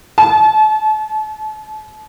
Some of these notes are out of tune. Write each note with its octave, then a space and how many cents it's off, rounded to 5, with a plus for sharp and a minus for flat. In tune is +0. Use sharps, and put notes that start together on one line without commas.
A5 -35